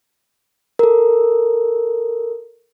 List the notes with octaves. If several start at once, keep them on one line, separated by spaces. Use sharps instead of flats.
A4 A#4